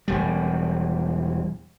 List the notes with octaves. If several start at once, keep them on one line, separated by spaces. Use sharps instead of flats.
E1 G3